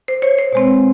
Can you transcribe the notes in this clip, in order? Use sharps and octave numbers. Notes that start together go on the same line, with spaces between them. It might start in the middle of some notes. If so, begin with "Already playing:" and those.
C5
C#5
C5
B2 G#3 C4